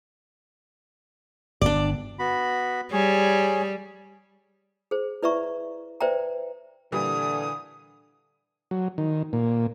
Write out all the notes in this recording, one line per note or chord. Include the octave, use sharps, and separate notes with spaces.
G1 B3 D4 D5
B3 F#4 B5
G3 G#4 C#5
G#4 C5
E4 B4 D5 E5 A#5 C#6
B4 C5 D5 E5 G5 A#5
A#2 D3 E3 G3 D#6
F#3
D#3
A#2